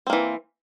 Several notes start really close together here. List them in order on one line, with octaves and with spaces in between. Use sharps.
C4 A#3 E3